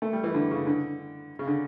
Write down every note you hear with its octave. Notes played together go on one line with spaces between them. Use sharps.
A3
G3
E3
D3
C#3
D3
C#3
D3